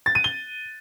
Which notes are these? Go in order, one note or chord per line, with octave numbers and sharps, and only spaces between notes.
A6
D#7
G7